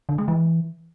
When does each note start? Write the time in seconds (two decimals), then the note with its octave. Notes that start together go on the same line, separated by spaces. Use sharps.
0.09 D3
0.18 G#3
0.28 E3